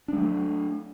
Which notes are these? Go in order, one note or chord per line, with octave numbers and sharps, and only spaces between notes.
F#3 G#3 A3 D4